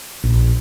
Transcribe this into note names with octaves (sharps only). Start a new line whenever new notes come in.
A#1